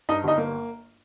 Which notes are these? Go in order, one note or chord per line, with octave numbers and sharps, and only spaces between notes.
G2 D#4 D#5
G1 D#4 D#5
A#3